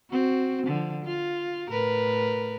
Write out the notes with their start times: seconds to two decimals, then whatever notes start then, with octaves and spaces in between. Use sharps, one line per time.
0.10 C4 F#4
0.67 D3 F3
1.05 F4
1.69 A2 A#4 B4